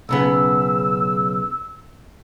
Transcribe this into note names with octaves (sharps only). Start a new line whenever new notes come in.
B1 C#3 B3 E6